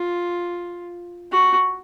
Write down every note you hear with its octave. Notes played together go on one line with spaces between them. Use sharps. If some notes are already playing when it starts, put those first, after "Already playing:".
Already playing: F4
F#4